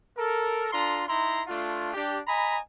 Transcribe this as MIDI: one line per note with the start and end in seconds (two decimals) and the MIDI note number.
0.18 0.71 69
0.18 0.71 70
0.72 1.04 62
0.72 1.04 65
0.72 1.04 69
0.72 1.04 82
0.72 1.04 84
1.07 1.42 63
1.07 1.42 64
1.07 1.42 82
1.07 1.42 84
1.47 1.93 57
1.47 1.93 62
1.47 1.93 65
1.94 2.18 62
1.94 2.18 67
2.27 2.57 75
2.27 2.57 80
2.27 2.57 82
2.27 2.57 83